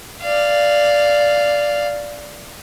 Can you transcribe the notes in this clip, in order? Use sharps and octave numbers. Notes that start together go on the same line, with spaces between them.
D5 F5